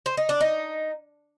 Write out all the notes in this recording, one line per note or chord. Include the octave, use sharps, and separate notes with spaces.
C5
D#4
D4
D#4